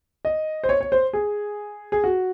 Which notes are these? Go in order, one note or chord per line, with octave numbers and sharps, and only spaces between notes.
D#5
C5
C#5
C#5
C5
G#4
G#4
F#4